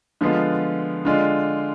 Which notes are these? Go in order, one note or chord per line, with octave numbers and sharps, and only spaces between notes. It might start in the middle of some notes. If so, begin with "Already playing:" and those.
D3 F3 G#3 B3 F4
D3 G#3 D4 F4